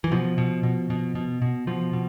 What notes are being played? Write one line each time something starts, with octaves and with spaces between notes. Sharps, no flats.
E3
B2 F3
B2
B2
B2
B2
B2
B2 F3
B2